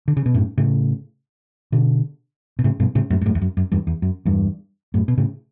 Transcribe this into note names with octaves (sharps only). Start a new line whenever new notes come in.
D3
C#3
B2
F#2 A2
A2 C#3
B2 D3
B2
A2 C#3
G2 B2
A2 C#3
F#2 A2
G2
F#2 A2
E2
F#2
F#2
E2 G2
E2
F#2
E2 G2
F#2 A2
B2
A2 C#3